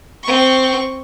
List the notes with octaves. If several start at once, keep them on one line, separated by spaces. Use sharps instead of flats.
C4 C#6